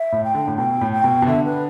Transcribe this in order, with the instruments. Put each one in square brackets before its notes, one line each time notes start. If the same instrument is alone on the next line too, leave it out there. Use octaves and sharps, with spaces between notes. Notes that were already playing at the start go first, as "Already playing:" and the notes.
Already playing: [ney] E5
[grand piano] A2
[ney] G5
[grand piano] D3
A2
[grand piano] B2 [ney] G5
[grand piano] A2
[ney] G5
[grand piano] B2
B2
[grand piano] D3 [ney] E5
[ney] B4